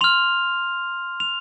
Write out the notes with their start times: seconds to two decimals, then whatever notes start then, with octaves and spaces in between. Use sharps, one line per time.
0.01 C6 F6 F7
1.20 F7